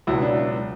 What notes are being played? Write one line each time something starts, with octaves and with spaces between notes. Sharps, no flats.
C#2 B2 F#3 E4
D4